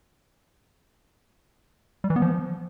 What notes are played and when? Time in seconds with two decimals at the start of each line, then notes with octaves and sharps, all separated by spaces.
2.04 G3
2.10 E3
2.16 B3
2.22 F3